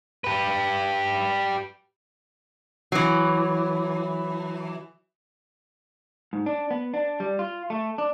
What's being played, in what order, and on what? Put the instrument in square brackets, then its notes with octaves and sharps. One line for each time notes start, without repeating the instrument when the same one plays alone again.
[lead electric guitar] G4 B4
[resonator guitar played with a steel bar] E3 F#3
[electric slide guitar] G#2
D4
B3
D4
G3
F4
A3
D4